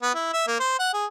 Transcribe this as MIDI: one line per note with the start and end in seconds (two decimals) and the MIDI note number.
0.02 0.12 59
0.15 0.30 64
0.33 0.43 76
0.47 0.59 58
0.60 0.76 72
0.79 0.90 78
0.93 1.06 68